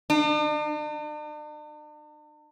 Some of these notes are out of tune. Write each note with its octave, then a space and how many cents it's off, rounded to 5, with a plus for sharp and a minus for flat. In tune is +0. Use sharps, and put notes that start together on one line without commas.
D4 +45